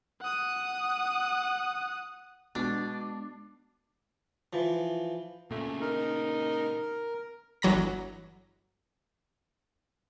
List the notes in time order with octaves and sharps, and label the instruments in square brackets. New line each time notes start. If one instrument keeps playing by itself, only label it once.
[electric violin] F#5 D#6
[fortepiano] B2 [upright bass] G#3 [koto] D4
[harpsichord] E3 F3
[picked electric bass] A#2 C#3 [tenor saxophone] A3
[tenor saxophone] D#4 [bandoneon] A#4
[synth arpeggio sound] G1 E3 F#3 A#5 A#6